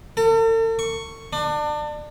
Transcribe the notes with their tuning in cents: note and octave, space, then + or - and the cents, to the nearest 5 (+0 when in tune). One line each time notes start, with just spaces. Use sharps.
A4 +45
C#6 +0
D4 +30